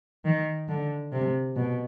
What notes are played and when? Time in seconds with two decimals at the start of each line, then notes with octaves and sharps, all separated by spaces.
0.25 D#3
0.68 D3
1.12 C3
1.56 B2